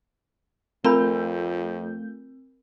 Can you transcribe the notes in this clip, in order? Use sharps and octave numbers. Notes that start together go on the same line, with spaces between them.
F2 A3 C4 F4 A#4 A#5 B5 G6